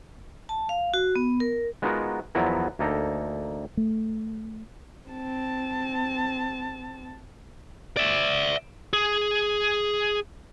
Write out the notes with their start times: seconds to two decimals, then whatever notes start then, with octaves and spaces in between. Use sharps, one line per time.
0.49 A5
0.69 F5
0.94 F#4
1.16 B3
1.40 A#4
1.82 G#3 B3 D#4 F4 F#4 A#4
2.35 E2 F3 F#3 B3 E4 A#4
2.79 D2 A#3 D#4 A4 A#5
3.77 A3
5.08 C4 A5
7.97 D5 E5
8.93 G#4